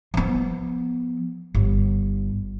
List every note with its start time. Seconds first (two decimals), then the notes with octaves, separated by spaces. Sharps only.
0.14 F3 B3
1.54 G1